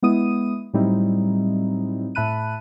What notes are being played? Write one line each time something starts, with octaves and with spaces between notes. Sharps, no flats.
G#3 B3 E4 D#6 D#7
A2 F#3 G3 C4 D#4 E4
A2 E5 A5 B5 F#6 D#7